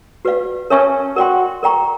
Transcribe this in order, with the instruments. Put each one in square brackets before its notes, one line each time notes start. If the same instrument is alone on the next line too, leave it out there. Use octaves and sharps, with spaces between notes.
[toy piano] F#4 B4 D5 F5
[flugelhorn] C#4 [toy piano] A#4 C#5 E5 A5 C#6
[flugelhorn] F#4 [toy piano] A#4 D5 G5 C6
[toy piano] A#4 D5 G5 A#5 C#6